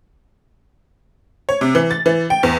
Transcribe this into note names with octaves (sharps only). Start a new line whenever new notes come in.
C#5
C3
E3
A6
E3
G5
E2